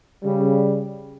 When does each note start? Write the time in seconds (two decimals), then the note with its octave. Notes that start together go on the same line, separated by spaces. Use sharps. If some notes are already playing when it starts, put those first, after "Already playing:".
0.24 C#3 G3